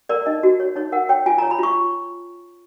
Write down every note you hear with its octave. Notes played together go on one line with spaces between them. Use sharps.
A#4 D5
D#4 D#5
F#4
C#5
D#4 C#5
A#4 F#5
C#5 G5
F4 G#5
A#5
C#5
B5
F4 C#6